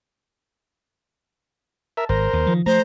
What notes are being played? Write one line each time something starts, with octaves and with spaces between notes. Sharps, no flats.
A#4 E5 A5
G#1 A#4 C5 A#6
D#2
D#3 F3
F3 A3 C5 A#5